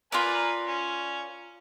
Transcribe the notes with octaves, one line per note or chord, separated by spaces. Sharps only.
F4 A#4 B4 D5 G#5 A#5
C#4